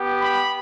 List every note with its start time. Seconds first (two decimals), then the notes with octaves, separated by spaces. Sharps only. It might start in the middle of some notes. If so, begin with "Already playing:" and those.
Already playing: B3 G4
0.20 B5